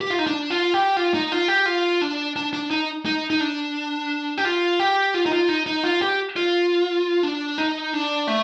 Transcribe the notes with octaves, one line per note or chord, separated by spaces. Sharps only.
G4
F4
D#4
D4
F4
G4
F4
D#4
F4
G4
F4
D4
D4
D4
D#4
D#4
D#4
D4
G4
F4
G4
F4
D#4
F4
D#4
D#4
F4
G4
F4
D4
D#4
D4
A3